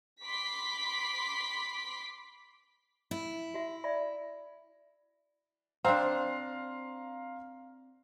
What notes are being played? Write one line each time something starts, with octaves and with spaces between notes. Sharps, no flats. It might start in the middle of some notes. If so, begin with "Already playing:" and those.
B5 C6 D6 B6
E4
F#4 E5
D5 E5 B5
C4 D4 F5 A#5 C6